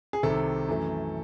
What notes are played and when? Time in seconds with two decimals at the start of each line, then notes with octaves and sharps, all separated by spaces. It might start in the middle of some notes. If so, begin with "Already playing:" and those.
0.13 G#4
0.23 C2 C3 D#3 A4
0.68 F#2 E3 A3